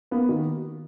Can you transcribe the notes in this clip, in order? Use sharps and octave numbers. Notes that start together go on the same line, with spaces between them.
A#3 B3
D#3